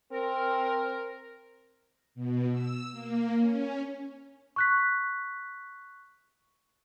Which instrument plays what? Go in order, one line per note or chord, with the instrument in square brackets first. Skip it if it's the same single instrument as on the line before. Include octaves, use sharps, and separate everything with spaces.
[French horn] C4 [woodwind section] A#4
[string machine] B2
E6
A#3
C#4
[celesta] C#6 F#6 B6